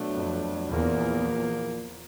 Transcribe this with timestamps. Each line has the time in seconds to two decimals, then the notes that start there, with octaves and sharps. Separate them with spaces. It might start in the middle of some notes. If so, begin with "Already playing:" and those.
Already playing: B2 F#3 A3 D4
0.14 F2
0.70 E2 A#2 F3 A#3